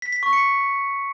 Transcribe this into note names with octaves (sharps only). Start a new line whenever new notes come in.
B6
B6
C#6
C#7